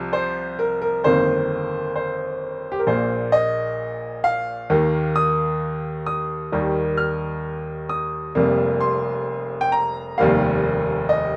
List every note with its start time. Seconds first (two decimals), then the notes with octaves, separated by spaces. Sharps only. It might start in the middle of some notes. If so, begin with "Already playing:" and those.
Already playing: C2 F3
0.13 C5
0.59 A#4
0.82 A#4
1.04 G1 F2 D#3 A#3 C5
1.95 C5
2.72 G4
2.79 A#4
2.87 A#1 A#2 A#3 C5
3.32 D#5
4.24 F5
4.70 D#2 D#3 A#3
5.16 D#6
6.06 D#6
6.52 D#2 D#3 G3 A#3
6.97 F6
7.89 D#6
8.35 F1 F2 C3 G3 A#3
8.81 C6
9.61 G5
9.72 A#5
10.18 F1 D#2 D#3 G3 A#3 F5
11.09 D#5